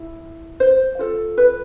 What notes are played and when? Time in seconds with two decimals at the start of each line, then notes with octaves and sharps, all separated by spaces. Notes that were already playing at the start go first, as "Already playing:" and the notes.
Already playing: E4
0.60 C5
0.99 F4 A4
1.38 B4